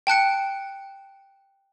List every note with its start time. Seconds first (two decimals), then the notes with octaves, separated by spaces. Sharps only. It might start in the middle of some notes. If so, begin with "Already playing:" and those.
0.07 G5 A5 F#6 C#7